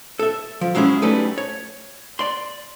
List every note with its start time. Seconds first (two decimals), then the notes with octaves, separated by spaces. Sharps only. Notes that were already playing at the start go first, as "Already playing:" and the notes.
0.19 A4 E5
0.61 F3
0.75 F#3 G#3 C#4 E4 G#4
1.02 F#3 G3 A3 C#4 D#4 B4
1.38 C#5
2.19 D5 C6